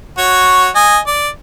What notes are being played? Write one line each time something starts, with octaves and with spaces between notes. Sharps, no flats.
F#4 C#5
D#5 G#5
D5